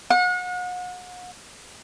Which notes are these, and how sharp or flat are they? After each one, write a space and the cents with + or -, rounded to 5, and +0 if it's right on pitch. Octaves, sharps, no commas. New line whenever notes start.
F#5 -40